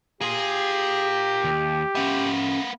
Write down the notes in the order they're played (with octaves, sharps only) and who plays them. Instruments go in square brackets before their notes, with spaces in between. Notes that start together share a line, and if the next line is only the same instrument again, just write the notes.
[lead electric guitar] A#3 F4 [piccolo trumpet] G4 [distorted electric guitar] G#4
[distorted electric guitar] D#2
[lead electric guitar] A#3 B3 [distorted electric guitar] C#4 E5